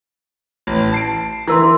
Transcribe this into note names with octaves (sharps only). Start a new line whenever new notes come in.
A1
A5 C7 D7
E3 E4 A#4 C6